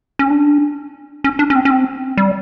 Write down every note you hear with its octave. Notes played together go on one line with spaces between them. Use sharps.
C#4
D4
C#4
D4
C#4
C4
C#4
C4
G3